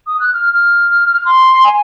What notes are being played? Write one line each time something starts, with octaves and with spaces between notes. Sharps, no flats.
D#6
F#6
F6
F6
C6
G#5